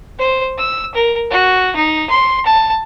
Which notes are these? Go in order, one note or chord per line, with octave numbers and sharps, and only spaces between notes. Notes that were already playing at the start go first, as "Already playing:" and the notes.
C5
E6
A#4
F#4
D#4
C6
A5